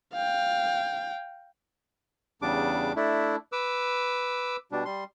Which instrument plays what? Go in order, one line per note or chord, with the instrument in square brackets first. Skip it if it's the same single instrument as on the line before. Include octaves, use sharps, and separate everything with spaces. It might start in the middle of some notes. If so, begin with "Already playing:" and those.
[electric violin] F5 G5
[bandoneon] E2 C#3 G3 D4 D6
A3 D4 E4
B4 D6 E6
B2 G3 D4
G3 C6